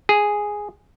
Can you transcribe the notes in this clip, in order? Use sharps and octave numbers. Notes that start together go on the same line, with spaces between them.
G#4